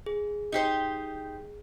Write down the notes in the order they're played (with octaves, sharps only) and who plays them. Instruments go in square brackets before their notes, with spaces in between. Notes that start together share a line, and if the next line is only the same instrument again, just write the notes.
[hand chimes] G#4
[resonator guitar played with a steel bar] D#4 G4 C5